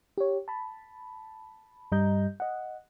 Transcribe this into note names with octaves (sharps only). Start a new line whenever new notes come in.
G4 C#5
A5 B5
G2 G3 D#5 A#5 G6
D#5 F#5